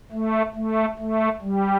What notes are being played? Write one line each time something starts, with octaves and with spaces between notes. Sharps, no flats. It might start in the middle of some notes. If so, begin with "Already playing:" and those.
A3
A3
A3
G3